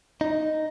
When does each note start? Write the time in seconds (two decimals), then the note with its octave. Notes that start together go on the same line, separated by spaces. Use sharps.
0.21 D#4